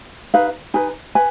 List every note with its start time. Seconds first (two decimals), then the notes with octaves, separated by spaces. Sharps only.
0.34 D#4 B4 F5
0.74 D#4 B4 G#5
1.15 B4 G#5